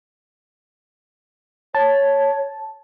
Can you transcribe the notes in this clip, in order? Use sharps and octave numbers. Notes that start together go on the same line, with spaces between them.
C#5 A5